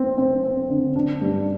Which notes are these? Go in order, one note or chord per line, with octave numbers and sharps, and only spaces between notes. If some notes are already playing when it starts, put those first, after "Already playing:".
Already playing: C4
C4
C4
D3
D4
G2